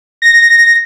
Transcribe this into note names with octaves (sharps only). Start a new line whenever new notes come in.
A#6